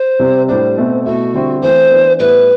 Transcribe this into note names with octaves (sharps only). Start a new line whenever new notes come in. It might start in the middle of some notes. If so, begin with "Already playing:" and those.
Already playing: C5
C3 G3 C4
A2 G3 D4 C5
B2 A3 C4
B2 A3 E4 F#4
D3 G3 C4 E4
E3 A3 C4 C5
E3 B3 D4
A2 G3 B3 E4 B4